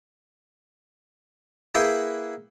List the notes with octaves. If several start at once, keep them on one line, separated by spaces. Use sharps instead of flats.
A#3 E4 G#4 B4 F#5 G5